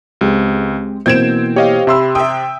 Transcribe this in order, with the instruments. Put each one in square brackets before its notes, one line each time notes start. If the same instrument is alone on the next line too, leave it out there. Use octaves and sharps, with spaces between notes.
[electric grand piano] C#2 [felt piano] G#3 C4 G4
[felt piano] B2 E3 A#3 [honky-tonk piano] C4 E7 [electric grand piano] G6 G#6 D7
[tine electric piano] G4 [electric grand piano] C#5 D#5 F5
[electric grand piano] C3 C6 E6 [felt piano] E5 B5
[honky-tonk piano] E5 G5 [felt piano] D#6